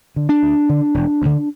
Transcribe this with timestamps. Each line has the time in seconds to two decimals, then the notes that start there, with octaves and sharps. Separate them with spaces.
0.16 D3
0.29 D4
0.43 D2
0.69 D3
0.94 E1
1.22 D2 D3